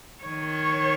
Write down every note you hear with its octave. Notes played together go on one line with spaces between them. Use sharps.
D#3 C#5